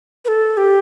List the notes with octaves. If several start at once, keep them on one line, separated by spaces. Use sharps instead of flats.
B4
A4
G4